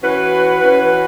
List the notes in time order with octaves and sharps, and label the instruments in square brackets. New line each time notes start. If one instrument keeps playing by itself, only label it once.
[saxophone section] E3 C#4 F#4 B4
E3 C#4 F#4 B4